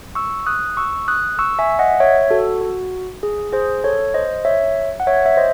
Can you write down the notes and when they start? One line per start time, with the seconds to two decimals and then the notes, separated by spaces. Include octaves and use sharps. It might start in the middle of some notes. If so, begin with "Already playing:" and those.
0.15 C#6 E6
0.46 D#6 F#6
0.77 C#6 E6
1.08 D#6 F#6
1.39 C#6 E6
1.59 E5 G#5
1.79 D#5 F#5
2.00 C#5 E5
2.30 F#4 A4
2.61 F#4
3.23 G#4
3.53 G#4 C5
3.84 A4 C#5
4.14 C5 D#5
4.45 C#5 E5
5.00 F#5
5.07 C#5 E5
5.26 E5
5.37 C5 D#5